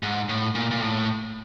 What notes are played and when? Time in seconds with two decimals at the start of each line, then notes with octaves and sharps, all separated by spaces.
0.03 G#2
0.29 A2
0.55 A#2
0.71 A#2
0.81 A2